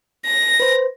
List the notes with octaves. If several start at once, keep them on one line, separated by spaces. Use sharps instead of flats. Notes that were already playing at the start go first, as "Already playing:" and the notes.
A#6
B4 C5